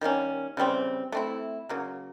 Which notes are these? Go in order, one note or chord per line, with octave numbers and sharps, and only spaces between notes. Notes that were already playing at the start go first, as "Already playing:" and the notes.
D#3 G3 A#3 C#4
C#3 E3 G3 C4
A3 C4 E4
C#3 F#3 A#3